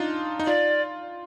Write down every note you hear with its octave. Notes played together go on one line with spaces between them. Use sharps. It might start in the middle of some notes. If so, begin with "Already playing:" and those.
Already playing: D4 D#4 F4
D#4
F4 D5